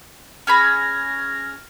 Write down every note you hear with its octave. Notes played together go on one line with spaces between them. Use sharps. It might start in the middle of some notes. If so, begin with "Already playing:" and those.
C#4 G#4 B5 F6 G#6 A#6